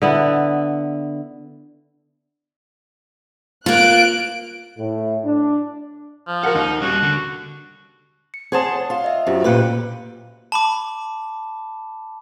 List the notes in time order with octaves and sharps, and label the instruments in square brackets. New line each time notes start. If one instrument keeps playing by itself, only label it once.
[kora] D3 B3 E4
[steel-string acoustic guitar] A#3 F4 [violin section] F#6 D7
[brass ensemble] A2
D4
[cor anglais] F3
[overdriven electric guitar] F#4 A4 [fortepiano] A#4 F#5
[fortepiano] D#2 [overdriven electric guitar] D#4
[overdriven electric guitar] G3 C#4 [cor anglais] F#4
[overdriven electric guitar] D3
[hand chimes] C#7
[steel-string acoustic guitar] G#4 C5 A5 [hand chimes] C#5 F#5 D#6
[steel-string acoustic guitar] F4
[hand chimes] D#5 E5
[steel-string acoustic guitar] F#2 [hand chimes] F4 G4 C5
[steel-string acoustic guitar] A#2 G4 B4 [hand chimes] A#3 F#6 C#7
[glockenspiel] A5 B5 D6